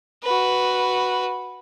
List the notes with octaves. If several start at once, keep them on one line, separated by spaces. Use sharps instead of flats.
F#4 B4